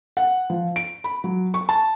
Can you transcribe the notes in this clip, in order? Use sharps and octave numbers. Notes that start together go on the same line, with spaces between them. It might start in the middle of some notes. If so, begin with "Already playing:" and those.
F#5
F3
D7
B5
F#3
C#6
A5